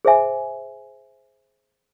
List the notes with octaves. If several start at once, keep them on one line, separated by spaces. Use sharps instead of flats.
G#4 C5 E5 G#5